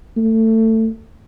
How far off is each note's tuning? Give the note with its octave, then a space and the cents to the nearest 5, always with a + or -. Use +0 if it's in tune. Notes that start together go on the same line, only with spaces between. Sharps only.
A3 +20